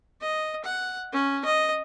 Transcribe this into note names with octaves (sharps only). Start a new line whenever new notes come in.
D#5
F#5
C#4
D#5